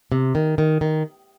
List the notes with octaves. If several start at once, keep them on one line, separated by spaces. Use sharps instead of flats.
C3
D#3
D#3
D#3